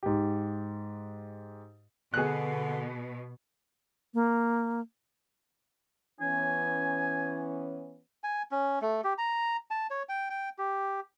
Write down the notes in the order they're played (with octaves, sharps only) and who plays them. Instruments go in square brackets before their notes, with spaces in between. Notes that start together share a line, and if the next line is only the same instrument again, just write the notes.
[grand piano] G#2 G4
[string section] B2 [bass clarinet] D3 [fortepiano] G#4 F#6
[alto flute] A#3
[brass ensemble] E3 B3 C#4 [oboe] G#5
[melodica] G#5
C#4
A3
G4
A#5
A5
C#5
G5
G5
G4